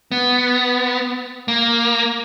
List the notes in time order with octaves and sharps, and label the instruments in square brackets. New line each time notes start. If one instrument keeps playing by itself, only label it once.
[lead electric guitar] B3
A#3